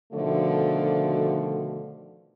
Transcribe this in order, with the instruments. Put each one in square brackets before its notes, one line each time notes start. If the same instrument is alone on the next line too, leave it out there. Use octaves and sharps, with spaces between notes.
[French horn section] B2 D3 D#3 F3 A3 F#4